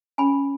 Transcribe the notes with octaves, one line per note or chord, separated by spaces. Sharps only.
C#4 G#4 C#5 G#5 B5